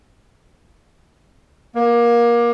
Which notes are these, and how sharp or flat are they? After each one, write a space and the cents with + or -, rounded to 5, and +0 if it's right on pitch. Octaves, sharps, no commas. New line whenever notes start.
A#3 +25